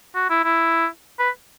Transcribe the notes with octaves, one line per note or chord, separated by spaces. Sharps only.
F#4
E4
E4
B4